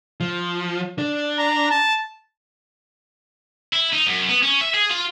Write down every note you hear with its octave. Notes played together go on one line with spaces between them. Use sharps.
F3
D4
A#5
A5
E4
D#4
F#2
B3
C#4
E5
G#4
F4